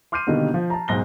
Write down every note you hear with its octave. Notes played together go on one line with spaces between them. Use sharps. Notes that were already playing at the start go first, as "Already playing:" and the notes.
C6 D6 F6 G6 C7 D#7
B2 D3 D#3 G3 A#3 D#4
F3
A5 A#5
B1 G#2 A#6 G7